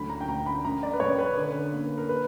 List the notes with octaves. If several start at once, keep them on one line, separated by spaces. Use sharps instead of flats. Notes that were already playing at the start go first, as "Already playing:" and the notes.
Already playing: D2 F#3 B5
A#5
G5
D2 A#5
B5
F#2 A#5
D5
B4
F#2 C#5
B4
D3
A#3
A#4
B4